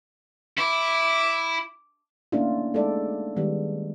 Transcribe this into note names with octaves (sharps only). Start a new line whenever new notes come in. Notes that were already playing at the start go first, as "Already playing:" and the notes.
E4 D6
A3 A#3 C#4 D4 E4 F4
G#3 A3 D#4 A4 D5
D#3 G3 G#3 B3